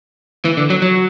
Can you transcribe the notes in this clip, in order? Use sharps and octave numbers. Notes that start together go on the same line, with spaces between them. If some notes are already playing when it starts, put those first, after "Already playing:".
E3
D3
F#3
F#3